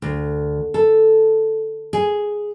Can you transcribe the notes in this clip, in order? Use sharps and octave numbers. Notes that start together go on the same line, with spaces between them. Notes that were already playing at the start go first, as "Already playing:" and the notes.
D2
A4
G#4